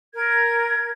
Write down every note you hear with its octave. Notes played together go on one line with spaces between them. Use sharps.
A#4 G#6